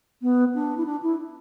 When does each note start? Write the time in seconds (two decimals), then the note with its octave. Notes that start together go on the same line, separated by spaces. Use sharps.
0.22 B3
0.55 D4
0.77 E4
0.86 D4
1.03 E4